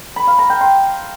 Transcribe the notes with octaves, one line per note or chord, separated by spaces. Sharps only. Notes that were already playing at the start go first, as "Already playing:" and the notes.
B5
F5
A#5
G5
C6